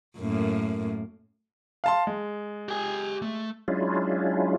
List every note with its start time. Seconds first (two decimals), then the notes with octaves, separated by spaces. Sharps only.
0.18 F#2 A2 A#3
1.84 F5 A5 C6
2.07 G#3
2.69 G4 G#5
3.22 A3
3.68 F#3 G#3 C#4 D4 E4 F4